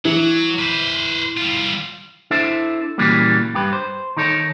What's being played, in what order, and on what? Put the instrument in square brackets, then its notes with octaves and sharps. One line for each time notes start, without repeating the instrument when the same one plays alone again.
[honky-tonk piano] E3 [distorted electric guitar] F#3
[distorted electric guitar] B4 C5
G3 F4
[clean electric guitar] D4 E4 A4 C5 E5
A#2 C#3 E3 F#3 G3 A#3
G2 G4 B4
C5
D#3 D#4 A4 C#5